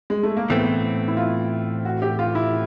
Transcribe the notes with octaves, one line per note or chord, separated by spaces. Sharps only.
G#3
A3
A#3
A2 E3 A3 B3 C4
E4
F4
F#4
G4
F4
E4